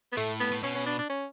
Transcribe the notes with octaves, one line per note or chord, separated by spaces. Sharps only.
B3
A2 A3
B3
A2
B2 C#4
C#4
D4
D4
C#4